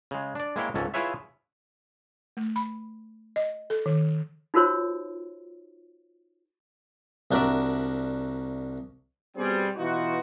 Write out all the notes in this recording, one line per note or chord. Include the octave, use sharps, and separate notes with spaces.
C#3 G#3
D4 D5
G#3 A#3 E4 C#5 G5
C#2 G#2 C#4 A4
E4 F4 G#4 B4 C#5 E5
A3
B5
D#5
A4
D#3
D#4 F4 F#4 A#4 C5 C#5
C2 D4 F#4 A#4 D5 E5
B2 G3 C4 G#4
B2 E3 D#4 F4 F#4